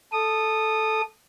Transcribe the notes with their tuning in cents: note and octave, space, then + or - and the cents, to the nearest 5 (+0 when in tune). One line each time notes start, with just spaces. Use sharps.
A4 -5 D#6 -15